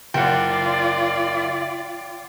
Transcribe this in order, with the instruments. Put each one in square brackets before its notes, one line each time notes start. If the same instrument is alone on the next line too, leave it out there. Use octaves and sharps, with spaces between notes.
[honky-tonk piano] F#1 [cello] F4 D5 [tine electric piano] F#5 G5